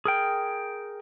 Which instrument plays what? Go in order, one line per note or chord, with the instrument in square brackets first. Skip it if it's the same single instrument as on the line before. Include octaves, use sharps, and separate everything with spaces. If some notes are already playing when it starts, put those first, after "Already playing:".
[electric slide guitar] G#4 A#4 G5